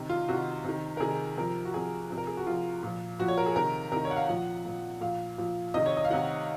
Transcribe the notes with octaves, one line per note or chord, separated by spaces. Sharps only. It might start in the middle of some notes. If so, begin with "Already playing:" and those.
Already playing: C3 D#3
F4
C3 D#3 F#4
C3 D#3
A#4
C3 D#3 G#4
C3 F3 A#4
F#4
C3 F3 G#4
C3 F3
A#4
G#4
F#4
C3 F3 F4
A#2 F3
A#2 F3 F#4
C#5
A#4
G#4
C3 D#3 A#4
C3 D#3 A#4
C#5
F#5
F5
A#2 F3 F#5
A#2 F3
A#2 F3 F5
A#2 F3
C3 D#3 D#5
C#5
D#5
F5
C3 D#3 F#5